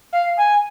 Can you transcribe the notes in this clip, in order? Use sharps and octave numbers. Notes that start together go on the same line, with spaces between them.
F5
G#5